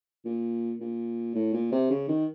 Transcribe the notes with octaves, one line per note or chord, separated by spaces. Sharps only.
A#2
A#2
A2
A#2
C3
C#3
D#3